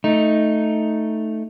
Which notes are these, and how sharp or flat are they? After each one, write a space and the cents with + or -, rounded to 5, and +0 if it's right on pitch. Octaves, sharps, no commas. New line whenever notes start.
A3 +0 D#4 +0